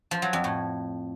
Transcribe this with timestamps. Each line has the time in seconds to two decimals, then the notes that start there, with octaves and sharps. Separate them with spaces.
0.11 F3
0.22 F#3
0.33 F2
0.44 A2